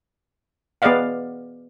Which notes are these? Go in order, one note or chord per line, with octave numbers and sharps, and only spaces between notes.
B3 G#4 D5 D#5 F5 F#5